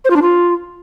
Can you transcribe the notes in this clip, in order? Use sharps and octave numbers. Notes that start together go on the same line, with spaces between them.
C5
F4
D4
F4